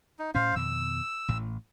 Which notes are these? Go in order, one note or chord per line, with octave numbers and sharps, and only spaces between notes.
D#4
A2 C#4 C5 F5
F2 B2 D#3 E6
A1 A2